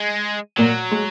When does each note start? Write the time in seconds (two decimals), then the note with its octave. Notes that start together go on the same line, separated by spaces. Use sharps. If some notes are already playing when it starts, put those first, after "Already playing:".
Already playing: G#3
0.57 A#2 F#3 A#3
0.91 G#3